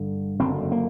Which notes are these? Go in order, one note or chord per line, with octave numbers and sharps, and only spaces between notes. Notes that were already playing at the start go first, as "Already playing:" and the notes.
Already playing: G1 G2 D3
F#1 F#2 D3 C4
A#3